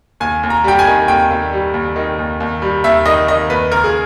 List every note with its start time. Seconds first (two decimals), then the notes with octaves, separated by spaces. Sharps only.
0.20 D#2 G#5
0.43 D#2
0.50 A#5
0.64 G3 G5
0.79 G#5
0.87 D#3
1.08 D#2 G5
1.31 D#2
1.53 G3
1.74 D#2
1.96 D#3
2.19 D#2
2.40 D#2
2.62 G3
2.84 D#2 E5
3.06 D#3 D#5
3.28 D#3 D#5
3.50 D#2 B4
3.72 C#2 A#4
3.84 G#4